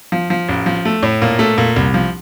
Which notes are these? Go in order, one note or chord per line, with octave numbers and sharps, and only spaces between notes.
F3
F3
A1
F3
A3
A2
A#2
A3
A#2
C2
F3